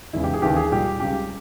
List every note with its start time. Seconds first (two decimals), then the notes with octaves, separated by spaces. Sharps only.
0.13 E1 E2 C#3 E4
0.24 G4
0.34 G#4
0.42 D#2 C#3 E3 G4
0.56 G#4
0.72 A#1 A#2 G3 G4
1.00 C#2 C#3 G3 G4